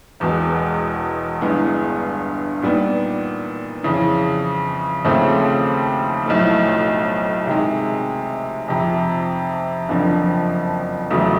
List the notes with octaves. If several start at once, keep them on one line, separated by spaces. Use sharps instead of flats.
E1 E2 B2 G#3
G1 G2 E3 G#3 B3
A#2 G3 B3 D#4
F2 C#3 E3
D#2 C#3 F3 A3 C4
B1 A2 F3 A3
C3 D#3 G#3
F2 C3 F3
F#1 F2 D3 F3
E1 E2 C#3 F#3 A3